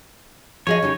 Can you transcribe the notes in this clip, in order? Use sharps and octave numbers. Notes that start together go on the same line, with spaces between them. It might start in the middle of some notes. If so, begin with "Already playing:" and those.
F3 G#4 C#5 D#5
C#3 D#4 G4